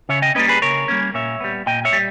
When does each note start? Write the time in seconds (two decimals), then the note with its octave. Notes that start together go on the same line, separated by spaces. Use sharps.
0.09 C#3 C#5 E5
0.22 D#5 G5
0.35 G3 A#3 C#4 B4 D#5
0.49 G#4 B4
0.62 C#3 A#4 C#5
0.88 G3 A#3 C#4
1.14 A#2 C#5 E5
1.41 G3 B3
1.66 A#2 D#5 G5
1.85 C#5 E5
1.93 G3